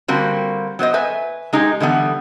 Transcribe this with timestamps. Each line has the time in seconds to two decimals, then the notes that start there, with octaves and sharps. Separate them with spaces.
0.08 D3 G3 A#3 C4 F#4
0.79 F#3 B3 C5 D#5
0.94 B4 E5 G#5
1.53 G#3 D#4 G4 G#4
1.80 D3 E3 G3 B3